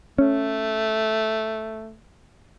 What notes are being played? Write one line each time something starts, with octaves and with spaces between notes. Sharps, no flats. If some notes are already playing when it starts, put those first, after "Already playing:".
A3 C#4